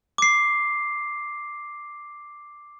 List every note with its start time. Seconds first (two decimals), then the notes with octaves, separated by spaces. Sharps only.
0.18 D6 C7